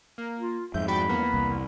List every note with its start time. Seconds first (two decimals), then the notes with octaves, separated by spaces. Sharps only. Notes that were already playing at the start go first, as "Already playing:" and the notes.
0.18 A#3
0.39 F4
0.74 F2 G#2 E5 G6
0.88 F#4 D5 G5 B5
1.09 E2 A#3 B3
1.34 C2